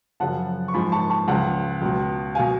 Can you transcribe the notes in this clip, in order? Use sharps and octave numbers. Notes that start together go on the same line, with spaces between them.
F#2 C#3 F3 F#5 A5
C#6
G#2 F3 G#5 B5
A5 C#6
A5 C#6
C#2 C#3 F3 F#5 A5
C#2 B2
B2 F5 G#5